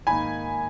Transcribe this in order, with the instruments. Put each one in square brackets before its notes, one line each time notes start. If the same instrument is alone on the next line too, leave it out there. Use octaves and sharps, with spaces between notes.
[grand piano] G#2 D#3 A#3 D#4 G#5 B5